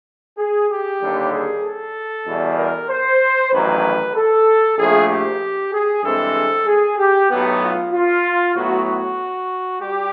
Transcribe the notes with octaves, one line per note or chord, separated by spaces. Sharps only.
G#4
G4
D#2 D3 G3
G#4
A4
E2 B2 G3
A#4
C5
A1 G2 D#3 F#3 B4
A4
A#1 A2 F3 A3 G#4
G4
G#4
G2 E3 G#3 C4 A4
G#4
G4
B1 A2 F#3 B3
F4
F4
A2 F#3 B3 F#4
F#4
G3 G4